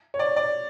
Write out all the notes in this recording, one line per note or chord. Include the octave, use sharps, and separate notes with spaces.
C#5
D5
D5